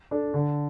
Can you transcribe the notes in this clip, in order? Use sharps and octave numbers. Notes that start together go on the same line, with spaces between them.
D4 A4
D3